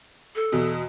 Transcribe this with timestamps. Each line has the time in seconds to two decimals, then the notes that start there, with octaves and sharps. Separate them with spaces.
0.36 A4
0.52 E2 B2